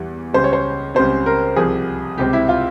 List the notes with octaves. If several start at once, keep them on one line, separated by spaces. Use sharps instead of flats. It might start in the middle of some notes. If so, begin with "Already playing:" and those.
Already playing: E2 E3 G3
C#2 C#3 G3 C5
C#5
C5
C#2 C#3 G3 C4 C5
A#4
C2 C3 F3 G#4
C#2 C3 G3 C4 G4
E4
F4